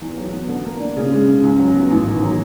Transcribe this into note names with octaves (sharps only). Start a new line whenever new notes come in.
E2
F#3
B3
D3
A#3
D4
C#3
G#3
C#3
C#2
F#3
B3
A1
D#3
F#3